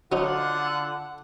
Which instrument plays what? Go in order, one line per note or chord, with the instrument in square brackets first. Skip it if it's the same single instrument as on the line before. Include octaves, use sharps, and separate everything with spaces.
[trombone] D3 [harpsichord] F#3 C#4 D#4 [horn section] F4 F#5